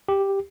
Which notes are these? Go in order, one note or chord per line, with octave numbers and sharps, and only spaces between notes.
G4